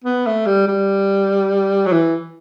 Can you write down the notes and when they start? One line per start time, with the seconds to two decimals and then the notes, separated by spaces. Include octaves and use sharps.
0.04 B3
0.26 A3
0.46 G3
0.67 G3
1.86 F#3
1.92 E3